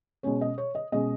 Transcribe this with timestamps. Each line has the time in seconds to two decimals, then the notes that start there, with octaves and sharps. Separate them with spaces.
0.23 B2 G#3 C#4 C#5
0.41 D#5
0.58 C#5
0.75 D#5
0.92 B2 G#3 C#4 D#5